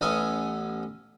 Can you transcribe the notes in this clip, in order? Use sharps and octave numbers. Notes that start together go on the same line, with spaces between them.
A1 B3 C#4 A4 G#5 D#6